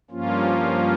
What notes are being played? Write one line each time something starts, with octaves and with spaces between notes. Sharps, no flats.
G2 F3 A#3 C#4 F4